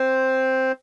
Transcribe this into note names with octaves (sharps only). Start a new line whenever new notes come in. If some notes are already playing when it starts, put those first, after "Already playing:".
Already playing: C4 C5